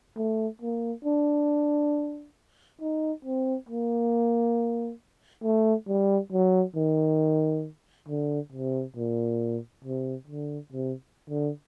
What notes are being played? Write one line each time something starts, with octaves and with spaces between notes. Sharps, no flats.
A3
A#3
D4
D#4
C4
A#3
A3
G3
F#3
D#3
D3
C3
A#2
C3
D3
C3
D3